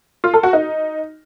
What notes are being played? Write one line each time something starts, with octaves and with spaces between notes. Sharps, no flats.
F4
A4
F#4
D#4